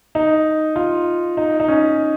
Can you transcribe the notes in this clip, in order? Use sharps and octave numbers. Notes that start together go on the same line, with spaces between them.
D#4
F4
D#4
D#4
C#4